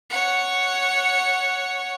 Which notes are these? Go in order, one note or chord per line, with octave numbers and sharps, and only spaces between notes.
C#5 F#5